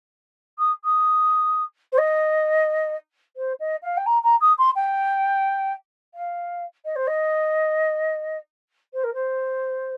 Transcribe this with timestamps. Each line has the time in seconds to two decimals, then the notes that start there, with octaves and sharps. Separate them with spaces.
0.58 D#6
0.84 D#6
1.92 C5
1.98 D#5
3.36 C5
3.60 D#5
3.82 F5
3.97 G5
4.06 A#5
4.23 A#5
4.41 D#6
4.58 C6
4.75 G5
6.14 F5
6.85 D#5
6.96 C5
7.07 D#5
8.93 C5
9.04 A#4
9.14 C5